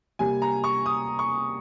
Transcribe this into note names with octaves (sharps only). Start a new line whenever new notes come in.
C3 G3 A#3 G#5
A#5
C#6
D#6
C#6